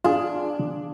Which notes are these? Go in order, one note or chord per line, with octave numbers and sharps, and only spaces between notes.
D4 F4 G#4